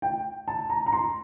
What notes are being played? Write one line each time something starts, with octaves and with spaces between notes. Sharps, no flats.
G5
A5
A#5
A#5
C6